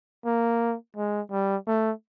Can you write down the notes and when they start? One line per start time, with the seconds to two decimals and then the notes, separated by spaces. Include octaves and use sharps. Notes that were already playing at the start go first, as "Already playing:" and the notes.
0.26 A#3
0.96 G#3
1.31 G3
1.67 A3